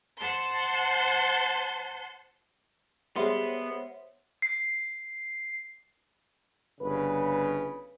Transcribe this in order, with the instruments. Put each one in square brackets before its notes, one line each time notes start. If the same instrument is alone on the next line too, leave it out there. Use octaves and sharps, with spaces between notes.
[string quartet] C5 F#5 A5 C6
[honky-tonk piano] G3 G#3 [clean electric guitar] B3 [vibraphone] C5 C#5 F#5 [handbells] E5 C6
[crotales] C7
[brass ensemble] G1 C#3 B4